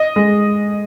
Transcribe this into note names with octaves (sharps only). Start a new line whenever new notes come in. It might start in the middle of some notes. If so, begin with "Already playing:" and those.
Already playing: D#5
G#3